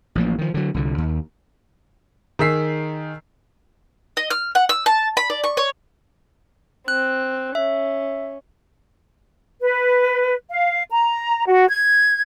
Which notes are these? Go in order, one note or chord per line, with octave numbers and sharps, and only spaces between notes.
A1 F3 A#3
D#3 F3
D3 F#3
C2 D3
D#2
D#3 G#4 E6 B6 C7
D#5
F6
F#5
E6
A5
B5
D5
C#6
C#5
C4 F#6
C#4 E5
B4
F5
A#5
F#4
G#6